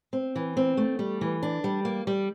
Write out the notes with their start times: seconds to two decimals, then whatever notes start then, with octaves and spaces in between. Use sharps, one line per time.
0.13 C4
0.36 E3
0.57 C4
0.77 A3
0.99 G3
1.21 E3
1.43 D4
1.64 G3
1.85 A#3
2.07 G3